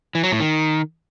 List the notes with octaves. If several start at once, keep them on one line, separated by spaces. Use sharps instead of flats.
E3
F#3
A2
D#3